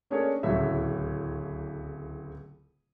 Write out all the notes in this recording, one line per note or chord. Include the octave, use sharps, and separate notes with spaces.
A3 C#4 D4 G#4 A#4 C#5
D1 C#2 A2 F#3 E5